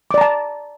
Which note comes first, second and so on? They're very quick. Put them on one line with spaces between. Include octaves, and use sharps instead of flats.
D6 D5 A#5 A5